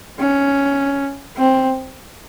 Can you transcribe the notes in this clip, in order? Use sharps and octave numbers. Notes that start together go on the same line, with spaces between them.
C#4
C4